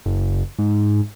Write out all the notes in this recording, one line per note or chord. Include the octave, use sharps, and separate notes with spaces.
F#1
G#2